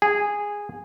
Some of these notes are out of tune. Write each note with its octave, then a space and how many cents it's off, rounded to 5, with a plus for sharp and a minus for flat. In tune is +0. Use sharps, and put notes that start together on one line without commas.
G#4 -10